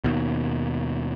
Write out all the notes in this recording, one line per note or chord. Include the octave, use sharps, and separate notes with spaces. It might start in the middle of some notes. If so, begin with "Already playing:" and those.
D#2 B2